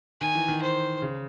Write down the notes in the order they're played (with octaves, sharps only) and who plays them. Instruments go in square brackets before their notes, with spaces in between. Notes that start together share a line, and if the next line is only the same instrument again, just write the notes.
[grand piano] D#3 [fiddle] G#5
[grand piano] E3
D#3
[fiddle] C5
[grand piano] C#3